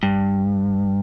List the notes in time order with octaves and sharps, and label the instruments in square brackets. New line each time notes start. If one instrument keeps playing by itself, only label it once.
[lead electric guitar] G2